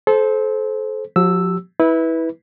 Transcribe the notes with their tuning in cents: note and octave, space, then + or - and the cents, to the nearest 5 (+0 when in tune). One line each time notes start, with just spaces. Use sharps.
A4 -30 C5 +0
F3 +40 G4 -20 E6 +0
E4 -20 B4 -5